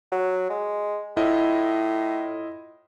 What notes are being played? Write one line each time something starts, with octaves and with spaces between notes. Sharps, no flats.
F#3
G#3
A2 E4 F4 D#5